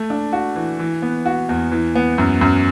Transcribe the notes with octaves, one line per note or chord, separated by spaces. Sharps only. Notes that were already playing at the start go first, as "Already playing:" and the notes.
Already playing: A3
D4
F#4
E3
E3
B3
F#4
E2
E3
B3
F#2
F#2